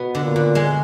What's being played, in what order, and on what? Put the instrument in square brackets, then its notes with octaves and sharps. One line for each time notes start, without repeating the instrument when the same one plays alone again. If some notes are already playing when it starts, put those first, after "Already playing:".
Already playing: [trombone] B2 [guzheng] B3
[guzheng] D3
[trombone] A#2
[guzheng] D3
G#3